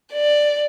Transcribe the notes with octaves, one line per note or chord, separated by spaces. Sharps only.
D5